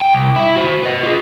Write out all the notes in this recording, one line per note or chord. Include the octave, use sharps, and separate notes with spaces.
G5
C2
E4 E5
F#4 C5
B4 D#5
F4 G#4